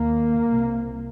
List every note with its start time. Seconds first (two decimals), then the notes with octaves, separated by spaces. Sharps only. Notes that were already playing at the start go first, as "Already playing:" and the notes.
Already playing: D#2 A#3
0.47 C2 C3